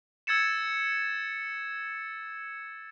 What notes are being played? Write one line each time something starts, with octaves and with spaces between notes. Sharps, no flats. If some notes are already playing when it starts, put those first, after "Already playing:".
E6 G#6 A6 C#7 E7